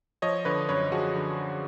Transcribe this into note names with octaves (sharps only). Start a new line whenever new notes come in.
F3 C#5 D#5
D3 B4 C#5
F#2 B4 C#5
F3 F#4 G#4
D3